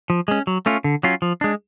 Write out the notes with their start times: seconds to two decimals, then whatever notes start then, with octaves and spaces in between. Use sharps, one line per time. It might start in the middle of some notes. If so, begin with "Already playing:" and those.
0.10 F3
0.28 G#3 C#4
0.47 F#3
0.66 A3 C#4 F4
0.84 D3
1.03 F#3 C#4 F4
1.22 F3
1.41 G#3 D4